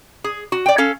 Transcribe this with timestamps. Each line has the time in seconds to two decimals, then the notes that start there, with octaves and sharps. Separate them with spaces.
0.24 G#4
0.52 F#4
0.66 D5 G5
0.78 C#4 A4 F5